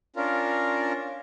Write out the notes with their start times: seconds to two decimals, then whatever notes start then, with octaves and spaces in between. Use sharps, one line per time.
0.16 C#4 D4 F4 A#4